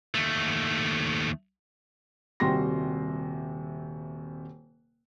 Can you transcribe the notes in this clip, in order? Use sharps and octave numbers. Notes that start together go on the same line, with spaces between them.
D#2 A3
D#1 C3 G3 F#4 C6 A#6